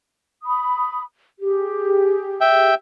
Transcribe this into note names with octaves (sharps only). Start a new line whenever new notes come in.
B5 D#6
G4 G#4
E5 G5